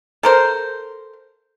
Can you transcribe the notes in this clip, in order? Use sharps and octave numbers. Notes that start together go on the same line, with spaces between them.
A4 A#4 C5